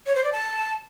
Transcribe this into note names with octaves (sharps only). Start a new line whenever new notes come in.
C#5
C5
D5
A5